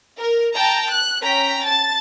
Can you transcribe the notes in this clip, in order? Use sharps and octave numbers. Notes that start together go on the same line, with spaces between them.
A#4
G5 A5 A#5
F#6
C#4 G5 A#5 B6
A5 A6